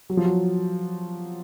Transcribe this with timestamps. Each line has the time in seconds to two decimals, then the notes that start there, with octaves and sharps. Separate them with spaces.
0.10 F#3
0.17 F3
0.25 F#3